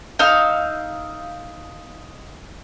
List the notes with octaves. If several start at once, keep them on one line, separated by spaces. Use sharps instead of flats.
D#4 F5 E6 F6